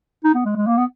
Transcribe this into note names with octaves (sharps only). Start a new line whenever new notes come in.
D#4
B3
G#3
G#3
A#3
B3